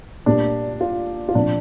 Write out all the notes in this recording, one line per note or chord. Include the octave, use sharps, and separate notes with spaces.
A#2 G3 A#3 D4
F4
F4
A#2 F3 C4 D4